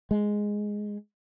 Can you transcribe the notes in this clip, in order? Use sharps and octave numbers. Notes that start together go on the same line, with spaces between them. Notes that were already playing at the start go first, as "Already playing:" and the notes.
G#3